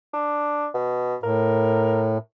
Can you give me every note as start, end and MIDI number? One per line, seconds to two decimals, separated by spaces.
0.13 0.67 62
0.74 1.15 47
1.23 2.18 45
1.23 2.18 70